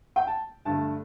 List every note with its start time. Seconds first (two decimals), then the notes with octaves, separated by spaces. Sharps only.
0.16 G5
0.27 A5
0.65 G2 D3 A3 A5